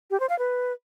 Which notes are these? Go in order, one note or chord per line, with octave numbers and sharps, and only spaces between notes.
G4
C5
F5
B4